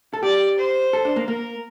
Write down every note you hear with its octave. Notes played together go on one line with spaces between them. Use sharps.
A4
G4 D5
C5
A4
D4
A#3
A#3 A#4